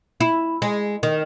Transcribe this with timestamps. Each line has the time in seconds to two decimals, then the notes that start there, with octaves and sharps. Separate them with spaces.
0.20 E4
0.62 G#3
1.03 D#3